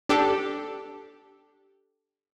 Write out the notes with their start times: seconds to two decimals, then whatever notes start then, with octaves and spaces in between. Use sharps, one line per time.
0.09 D4 G4 A4